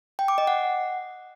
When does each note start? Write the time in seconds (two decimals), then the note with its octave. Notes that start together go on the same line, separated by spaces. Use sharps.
0.19 G5
0.28 D6
0.38 D#5
0.47 F#5